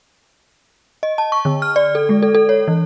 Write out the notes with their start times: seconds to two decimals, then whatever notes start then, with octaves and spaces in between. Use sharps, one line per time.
1.03 D#5
1.18 A5
1.32 C#6
1.45 D3
1.62 F6
1.76 D5
1.95 A4
2.09 G#3
2.22 A4
2.35 A4
2.49 C#5
2.68 E3